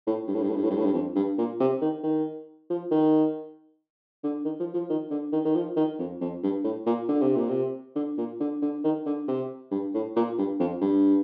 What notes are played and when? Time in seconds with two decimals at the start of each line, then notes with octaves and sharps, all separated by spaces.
0.07 A2
0.28 G2
0.35 A2
0.42 G2
0.49 A2
0.56 G2
0.64 A2
0.71 G2
0.78 A2
0.85 G2
0.94 F2
1.16 G2
1.38 A#2
1.60 C3
1.81 D#3
2.04 D#3
2.70 F3
2.91 D#3
4.24 D3
4.45 D#3
4.60 F3
4.74 F3
4.90 D#3
5.11 D3
5.32 D#3
5.45 D#3
5.55 F3
5.77 D#3
5.99 F2
6.21 F2
6.43 G2
6.64 A2
6.86 A#2
7.09 D3
7.22 C3
7.36 A#2
7.49 C3
7.96 D3
8.18 A#2
8.40 D3
8.62 D3
8.84 D#3
9.06 D3
9.28 C3
9.71 G2
9.94 A2
10.16 A#2
10.38 G2
10.60 F2
10.82 G2